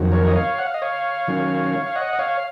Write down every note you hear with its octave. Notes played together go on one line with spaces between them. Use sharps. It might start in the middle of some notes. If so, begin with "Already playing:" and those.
Already playing: F2 D#3 F#3
A#4 C#5
D#5
C#5 F5
F#5
F5
D#5
C#5 F5
D#3 F#3 C#4
F5
D#5 F#5
D#5
C#5 F5